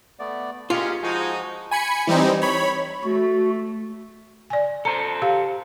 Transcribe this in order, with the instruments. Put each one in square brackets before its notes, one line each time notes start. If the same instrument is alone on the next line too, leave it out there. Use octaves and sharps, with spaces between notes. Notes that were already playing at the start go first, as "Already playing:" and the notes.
[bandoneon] A3 B3 D5
[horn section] G#3 C#4 [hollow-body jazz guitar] F4 [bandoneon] G4 A#4
[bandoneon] F3 F#4 [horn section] G#3 D#4
[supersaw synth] G#5 B5 C#7
E3 G3 C4 D#4
C#5 B5
[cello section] A3 [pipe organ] F#4
[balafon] D5 G#5
[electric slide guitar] A4 C5 [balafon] A#5
[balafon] G4 F5